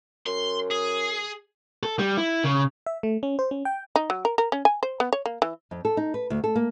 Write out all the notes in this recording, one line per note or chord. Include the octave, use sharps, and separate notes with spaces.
F#2 C6
G#4
A4
G3
E4
C#3
E5
A3
C#4
C5
C#4
G5
D#4
F#3
A#4
A#4
C#4
G#5
C5
B3
C#5
A#3
E3
F2
A4
D#4
B4
D2
A4
A#3